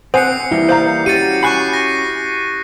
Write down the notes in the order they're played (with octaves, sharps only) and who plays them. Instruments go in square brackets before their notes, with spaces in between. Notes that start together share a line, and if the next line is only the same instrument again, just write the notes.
[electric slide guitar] C4 [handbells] C5 G#5 [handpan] F#5 [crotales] D#6 C7 C#7
[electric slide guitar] E3 G3 A#3 [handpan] E4
[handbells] C5 F5 A#5 [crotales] G6
[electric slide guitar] C#4 F#4 [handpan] G4 [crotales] A6 C#7 D#7
[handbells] G#5 B5 [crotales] C#6 F#6 C7
[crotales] A#6